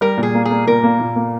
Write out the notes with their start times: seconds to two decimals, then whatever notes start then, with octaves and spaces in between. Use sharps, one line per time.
0.01 G3 A#4
0.17 A#2
0.23 G#4
0.34 A#3
0.45 G#4
0.51 A#3
0.67 A#2 A#4
0.83 A#3
0.99 A#2
1.16 A#3